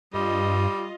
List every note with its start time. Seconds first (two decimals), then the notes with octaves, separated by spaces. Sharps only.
0.14 G2 G3 F4 D#5